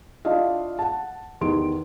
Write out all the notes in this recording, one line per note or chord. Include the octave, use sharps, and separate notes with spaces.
D4 E4 F4 D#5 F5
F#5 A5
E2 D#3 G4 C6 D7